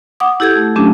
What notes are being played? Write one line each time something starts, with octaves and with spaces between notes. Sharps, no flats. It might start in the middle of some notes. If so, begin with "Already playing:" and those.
F#5 D6 D#6
E4 G4 A4 G6 G#6
A3
F#3 A3 C#4 D4 G4